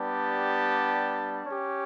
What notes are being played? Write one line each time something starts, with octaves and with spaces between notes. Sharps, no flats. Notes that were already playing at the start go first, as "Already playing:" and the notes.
Already playing: G3 B3 D4 G4 A5
C#4 G4